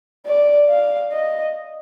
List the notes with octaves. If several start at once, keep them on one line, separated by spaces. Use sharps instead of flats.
D5
F5
D#5